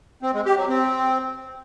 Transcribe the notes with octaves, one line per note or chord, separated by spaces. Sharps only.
C4
G#3
G4
F#3
C4